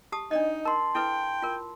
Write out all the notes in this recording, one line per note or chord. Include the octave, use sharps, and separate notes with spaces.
G4 A5 D#6
D4 D#4 D5 D#5
A#4 A5 C6
E4 A4 B4 G5
F4 A#4